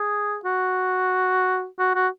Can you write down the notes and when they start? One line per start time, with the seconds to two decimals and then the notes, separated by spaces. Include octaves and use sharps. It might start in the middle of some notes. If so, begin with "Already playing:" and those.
Already playing: G#4
0.45 F#4
1.79 F#4
1.95 F#4